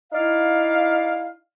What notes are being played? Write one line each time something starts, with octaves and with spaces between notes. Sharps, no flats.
D#4 E4 D5 F5